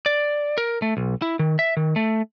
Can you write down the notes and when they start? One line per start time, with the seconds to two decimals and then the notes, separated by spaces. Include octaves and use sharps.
0.06 D5
0.58 A#4
0.82 A3
0.97 B1
1.22 E4
1.39 D#3
1.59 E5
1.77 D#3
1.96 A3